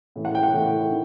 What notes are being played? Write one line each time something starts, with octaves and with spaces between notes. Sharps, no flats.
A2 E3
F#5
G5
F#5
A2 E3
D#3